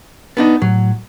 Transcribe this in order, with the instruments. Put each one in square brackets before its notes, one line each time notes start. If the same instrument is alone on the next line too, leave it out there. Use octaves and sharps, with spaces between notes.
[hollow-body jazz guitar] B3 D4 D#4
[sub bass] A2 [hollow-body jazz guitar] F#3